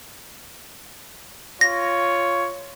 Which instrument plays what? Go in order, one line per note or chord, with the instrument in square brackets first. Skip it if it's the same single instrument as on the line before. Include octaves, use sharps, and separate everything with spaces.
[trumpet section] F4 C#5 [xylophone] A#6